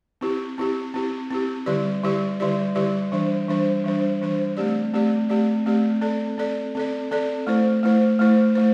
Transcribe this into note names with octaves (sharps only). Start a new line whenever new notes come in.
C4 E4 G4
C4 E4 G4
C4 E4 G4
C4 E4 G4
D3 G3 E4 G4 D5
D3 G3 E4 G4 D5
D3 G3 E4 G4 D5
D3 G3 E4 G4 D5
E3 G3 D4 C5
E3 G3 D4 C5
E3 G3 D4 C5
E3 G3 D4 C5
A3 C4 G4 D5
A3 C4 G4 D5
A3 C4 G4 D5
A3 C4 G4 D5
C4 A4 D5
C4 A4 D5
C4 A4 D5
C4 A4 D5
A3 E4 C5
A3 E4 C5
A3 E4 C5
A3 E4 C5